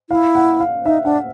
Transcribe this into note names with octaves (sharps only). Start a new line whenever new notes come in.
E4 F5
F#5
F5
D#4 E5
D4 F#5